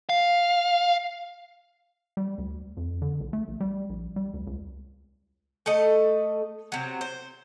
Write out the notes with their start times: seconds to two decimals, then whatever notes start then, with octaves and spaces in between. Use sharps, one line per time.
0.09 F5
2.17 G3
2.38 D2
2.77 F2
3.02 D3
3.21 B1
3.33 A3
3.48 A#1
3.60 G3
3.90 A#1
4.16 G3
4.34 D2
4.47 C#2
5.66 A3 A4 D#5
6.72 C3 F#3
7.01 C5